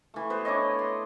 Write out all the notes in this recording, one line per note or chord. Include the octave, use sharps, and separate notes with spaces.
E3 A3
B3 B4 C5
D4 E4 C#5 D#5
C6